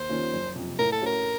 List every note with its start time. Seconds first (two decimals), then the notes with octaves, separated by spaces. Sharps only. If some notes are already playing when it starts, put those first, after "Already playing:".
Already playing: D#2 C5
0.09 D#3 A#3 C#4 F4
0.33 F#1
0.56 F2 C3
0.79 A2 A#4
0.92 A4
1.02 A3 C#4 F#4 A#4